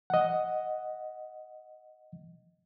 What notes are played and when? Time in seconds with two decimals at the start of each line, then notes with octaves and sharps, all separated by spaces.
0.10 D#5 F#5